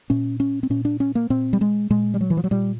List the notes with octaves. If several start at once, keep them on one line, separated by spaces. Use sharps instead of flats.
A#2 C#4
C#4
C4
A#2 C#4
D4
C#4
A#3
A#2 C4
G3
G#3
A#2 G#3
G3
F#3
E3
F3
F#3
A#2 G3